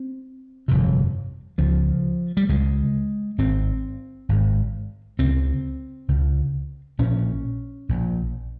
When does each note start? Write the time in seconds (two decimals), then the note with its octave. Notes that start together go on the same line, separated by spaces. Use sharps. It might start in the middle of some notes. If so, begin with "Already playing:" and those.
Already playing: C4
0.68 G1 F2 C3
1.58 C#2 C#3 F3
2.37 G3
2.49 C#2 C#3 G#3
3.38 G#1 G#2 C4
4.29 G#1 G#2
5.19 C#2 C#3 C4
6.08 C#2 C#3
6.99 A#1 A#2 C#4
7.89 A#1 A#2